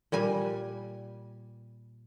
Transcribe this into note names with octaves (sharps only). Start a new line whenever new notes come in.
A#2 G3 G#5